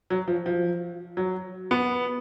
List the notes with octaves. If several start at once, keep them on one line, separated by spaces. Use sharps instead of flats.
F#3
F3
F3
F#3
B3